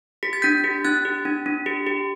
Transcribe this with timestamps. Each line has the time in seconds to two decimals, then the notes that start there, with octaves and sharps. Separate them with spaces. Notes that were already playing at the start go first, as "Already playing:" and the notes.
0.23 G4 B6
0.33 A6
0.42 D4 G6 B6
0.64 G4
0.85 D4 F#6 A6
1.05 G4
1.25 D4
1.46 D4
1.66 G4
1.87 G4